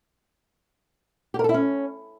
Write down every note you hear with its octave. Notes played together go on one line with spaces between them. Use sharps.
G4
A#4
A4
E4
C#4